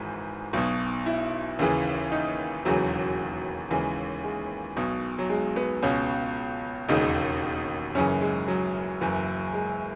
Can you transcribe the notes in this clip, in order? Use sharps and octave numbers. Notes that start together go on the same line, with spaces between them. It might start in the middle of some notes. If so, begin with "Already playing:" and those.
Already playing: G#1 G#2 E3
B1 B2
E4
D#2 C#3 E3
D#4
E1 D#2 C#3 E3 F#3
D#2 C#3 E3 G#3
G#3
B1 B2
F#3
G#3
B3
C#2 B2 C#4
E1 D#2 C#3 D#4
F#1 F#2 C#3 E3 C#4
G#3
F#3
F#1 F#2 E3
G#3